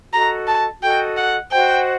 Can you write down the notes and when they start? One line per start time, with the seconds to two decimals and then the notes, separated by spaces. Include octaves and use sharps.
0.12 F#4 A4 D#5 A#5
0.47 A5
0.82 F#4 A4 D#5 G5
1.17 F#5
1.52 F#4 C5 D#5 F#5 G5